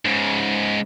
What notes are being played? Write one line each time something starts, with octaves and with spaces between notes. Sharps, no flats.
G#2 C#3